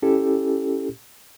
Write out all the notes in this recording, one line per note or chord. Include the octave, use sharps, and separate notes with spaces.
C#4 E4 G4 A4